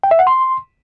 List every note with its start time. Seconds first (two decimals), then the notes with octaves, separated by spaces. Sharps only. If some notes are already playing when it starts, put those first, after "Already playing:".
0.04 G5
0.11 E5
0.19 F#5
0.27 C6